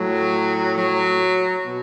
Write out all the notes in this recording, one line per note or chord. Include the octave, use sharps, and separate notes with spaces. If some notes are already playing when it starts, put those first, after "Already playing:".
Already playing: A2 F#3
F#3
B2